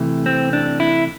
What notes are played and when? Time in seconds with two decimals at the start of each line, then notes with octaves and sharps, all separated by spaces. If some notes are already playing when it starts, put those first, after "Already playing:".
Already playing: C3 E3 A3
0.26 C4
0.53 D4
0.80 E4